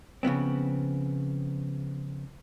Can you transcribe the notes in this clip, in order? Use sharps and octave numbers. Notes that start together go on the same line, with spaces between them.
C#3 F3 B3 C4